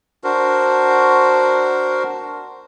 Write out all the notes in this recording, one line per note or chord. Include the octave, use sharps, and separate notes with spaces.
D4 F#4 A#4 C5